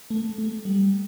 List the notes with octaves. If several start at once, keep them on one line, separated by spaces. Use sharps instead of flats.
A3
A3
G3